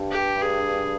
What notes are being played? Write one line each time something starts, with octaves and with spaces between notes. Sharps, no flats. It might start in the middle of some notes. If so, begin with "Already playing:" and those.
Already playing: G2
G4
G#4